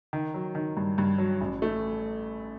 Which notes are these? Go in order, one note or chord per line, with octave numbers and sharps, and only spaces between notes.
D#3
F#3
D#3
G2
G2
F#3
A1
A3